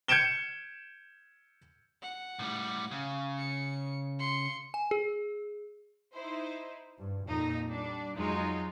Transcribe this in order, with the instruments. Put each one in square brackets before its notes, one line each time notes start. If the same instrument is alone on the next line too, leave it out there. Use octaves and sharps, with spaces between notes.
[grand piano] G6 G#6 C#7 D7 E7 G7
[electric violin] F#5
[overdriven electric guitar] A2 G3
C#3
[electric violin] C#7
C6 C#7
[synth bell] G#5
G#4
[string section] D#4 E4 C5
G2
F2 A#2 D#4
G3 D4
F2 F#3 G#3 D#4 F4